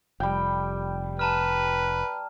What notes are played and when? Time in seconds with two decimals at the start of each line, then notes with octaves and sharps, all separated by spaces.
0.20 F1 G3 G5
1.19 B4 A5 A#5 F6